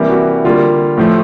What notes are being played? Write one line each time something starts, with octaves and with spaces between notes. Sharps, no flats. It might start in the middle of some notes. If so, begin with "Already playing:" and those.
Already playing: C3 E3 G3 A#3 G4
F#4
D3 G3 A#3 F4
A2 F3 A3